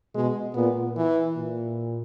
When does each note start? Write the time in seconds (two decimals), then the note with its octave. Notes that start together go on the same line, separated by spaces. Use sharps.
0.15 B2 G#3
0.55 A#2 B3
0.96 E3
1.36 A#2